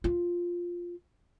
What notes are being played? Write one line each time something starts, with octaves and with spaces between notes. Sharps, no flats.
F4